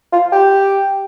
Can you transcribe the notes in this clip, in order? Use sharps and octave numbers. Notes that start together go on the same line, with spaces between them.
F4
G4